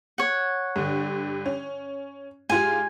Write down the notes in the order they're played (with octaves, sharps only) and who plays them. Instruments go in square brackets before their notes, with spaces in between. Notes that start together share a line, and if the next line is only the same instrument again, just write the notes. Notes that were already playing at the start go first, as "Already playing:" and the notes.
[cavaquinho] C#5 F#5
[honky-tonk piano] G2 D3
C#4
[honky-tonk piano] G#2 F4 G4 [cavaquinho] G#5